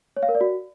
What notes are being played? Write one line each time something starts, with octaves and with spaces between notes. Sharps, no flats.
C#5
F5
A#4
D5
F#4